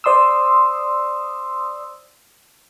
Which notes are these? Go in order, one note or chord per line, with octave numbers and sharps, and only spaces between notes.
C5 D5 C6 D#6 E6